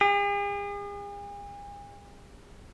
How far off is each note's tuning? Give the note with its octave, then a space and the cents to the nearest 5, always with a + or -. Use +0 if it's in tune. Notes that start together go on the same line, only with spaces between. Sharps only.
G#4 -45